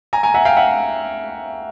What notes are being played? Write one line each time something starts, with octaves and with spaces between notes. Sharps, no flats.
G#5 A#5
G#5 A#5
E5 F#5
F5 G5
E5 F#5